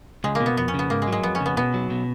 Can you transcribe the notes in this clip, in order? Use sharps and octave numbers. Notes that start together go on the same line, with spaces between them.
C#2 G#3
A#3
B2
B3
F2 B3
C#4
C#3 B3
G#2 A#3
G#3
F#3
G#3
F2 B3
C#4
C#3
B3
B2 B3
F#3
B2